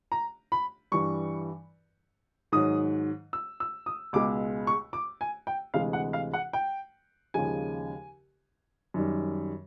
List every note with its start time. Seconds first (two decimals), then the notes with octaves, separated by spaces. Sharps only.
0.12 A#5
0.52 B5
0.92 G2 E3 G3 C#6
2.52 G#2 D#3 F#3 D#6
3.33 E6
3.60 E6
3.86 D#6
4.13 C#2 B2 G#3 D6
4.67 C#6
4.93 D6
5.21 G#5
5.47 G5
5.74 D2 C3 E3 G#3 F5
5.93 F#5
6.13 F5
6.34 F#5
6.53 G5
7.34 D#2 C#3 F3 G#3 G#5
8.94 F#2 D#3 G3